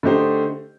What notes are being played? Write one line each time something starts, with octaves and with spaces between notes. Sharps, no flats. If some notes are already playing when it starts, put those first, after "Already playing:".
D3 A3 D#4 G4 C5